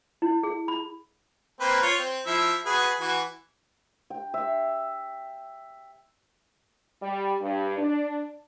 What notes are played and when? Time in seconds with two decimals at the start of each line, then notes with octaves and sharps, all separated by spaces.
0.22 E4
0.43 G#4
0.68 B5
1.60 A#3 C4 B4
1.82 F4 C#5
1.98 C4
2.26 F3 E4 E5
2.66 F#4 G#4 B4
3.00 E3 F#4
4.10 G5
4.34 E5
7.02 G3
7.41 G2
7.78 D4